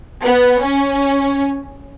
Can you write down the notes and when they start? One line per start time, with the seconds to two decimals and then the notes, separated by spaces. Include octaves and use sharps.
0.23 B3
0.60 C#4